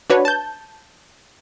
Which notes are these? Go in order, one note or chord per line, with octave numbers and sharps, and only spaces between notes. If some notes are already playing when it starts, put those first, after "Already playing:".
D4 F#4 B4 C#5
A5 G6